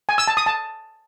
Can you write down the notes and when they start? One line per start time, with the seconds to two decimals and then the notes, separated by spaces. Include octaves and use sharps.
0.09 G#5
0.18 E6
0.28 A5
0.37 D#6
0.46 A5